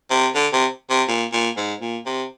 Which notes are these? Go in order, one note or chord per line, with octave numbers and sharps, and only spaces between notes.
C3
D3
C3
C3
A#2
A#2
G#2
A#2
C3